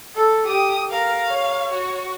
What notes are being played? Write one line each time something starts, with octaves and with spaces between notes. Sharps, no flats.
A4
G4 D#6
A#4 F5
C#5
F#4